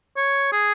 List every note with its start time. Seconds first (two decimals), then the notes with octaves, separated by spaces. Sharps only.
0.17 C#5
0.52 G#4